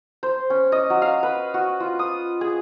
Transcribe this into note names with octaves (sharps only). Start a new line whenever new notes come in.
C5
C#4
D#5
F#3
F5
B4
F#4
F4
D#6
G#4